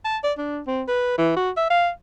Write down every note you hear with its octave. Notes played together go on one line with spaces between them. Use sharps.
A5
D5
D4
C4
B4
E3
F#4
E5
F5